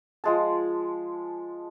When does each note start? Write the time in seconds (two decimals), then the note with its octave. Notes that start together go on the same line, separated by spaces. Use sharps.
0.24 F3 G#3 A5